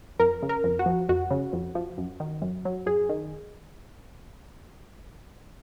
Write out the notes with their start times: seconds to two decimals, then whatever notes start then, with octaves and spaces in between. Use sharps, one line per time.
0.19 F2 A#4
0.42 C#3
0.49 A#4
0.64 F2
0.79 F#4
0.86 F3
1.09 F2 F#4
1.31 C#3
1.53 F2
1.75 F3
1.98 F#2
2.20 D#3
2.42 F#2
2.65 F#3
2.86 F#2 G#4
3.09 D#3